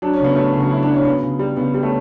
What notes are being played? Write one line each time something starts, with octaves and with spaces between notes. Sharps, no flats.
F#3 D4
C#4
C#3 B3
F#3 A3 C#4
C#3
F#4
F#3 E4
D4
F#3
C#4
C#3 B3
C#3
G3
C#3 B3
G3
A3 C#4